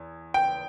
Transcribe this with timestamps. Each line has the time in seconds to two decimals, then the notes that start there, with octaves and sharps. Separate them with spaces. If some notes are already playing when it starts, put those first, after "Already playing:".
Already playing: E2
0.34 G5